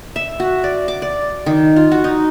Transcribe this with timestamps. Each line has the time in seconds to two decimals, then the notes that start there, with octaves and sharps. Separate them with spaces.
0.16 E5
0.40 F#4
0.64 D5
0.88 D6
1.02 D5
1.46 D#3
1.76 F4
1.92 F#4
2.04 D#4